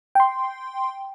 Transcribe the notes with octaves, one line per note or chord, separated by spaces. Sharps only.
G5 C6